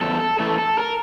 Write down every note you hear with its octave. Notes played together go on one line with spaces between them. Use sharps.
E2 A4
A4
E3 A3 A4
A4
A#4